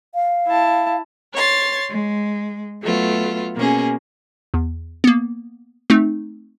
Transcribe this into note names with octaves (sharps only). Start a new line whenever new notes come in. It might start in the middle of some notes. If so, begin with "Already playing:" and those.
F5
E4 A5
C#5 C6 A6
G#3
F#3 A3 B3 F4
B2 A#3 C#4 G#4
E2
A#3 B3
A3 C4 D#4